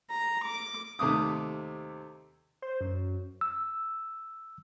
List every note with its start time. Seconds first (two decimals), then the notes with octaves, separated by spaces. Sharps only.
0.10 A#5
0.44 D6
0.99 D#2 C3 A3 D6 D#6
2.62 C5
2.81 F#2
3.41 E6